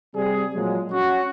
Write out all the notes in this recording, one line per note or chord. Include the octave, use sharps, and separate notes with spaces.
C3 G3 G#4
A#2 F3 F#3 G#3
C#4 F#4